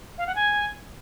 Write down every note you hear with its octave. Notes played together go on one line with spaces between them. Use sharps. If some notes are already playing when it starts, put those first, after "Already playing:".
F5
F#5
G#5